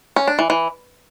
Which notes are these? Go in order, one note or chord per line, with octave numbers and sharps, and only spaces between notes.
C#4
D4
E3
E3